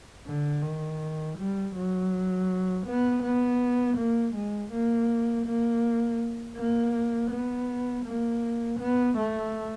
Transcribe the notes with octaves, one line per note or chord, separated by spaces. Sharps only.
D3
D#3
G3
F#3
B3
B3
A#3
G#3
A#3
A#3
A#3
B3
A#3
B3
A3